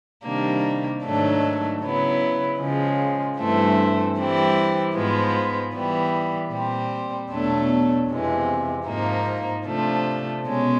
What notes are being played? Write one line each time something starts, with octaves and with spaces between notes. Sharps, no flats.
C3 D#3 G3 A#3 D4
G#2 D#3 F#3 A3 D4
C#3 F#3 B3 E4
C#3 F3 G#3
G2 E3 A3 C4
E3 G3 C4 E4
G#2 F3 G#3 B3
E3 G3 B3
A#2 G3 C4
E2 B2 F#3 A3 D4
F2 C3 E3 G#3
G#2 F3 A#3 D#4
C3 F3 A3 D4
B2 G#3 C#4